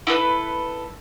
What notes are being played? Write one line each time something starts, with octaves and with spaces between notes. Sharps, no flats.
E4 A4 B4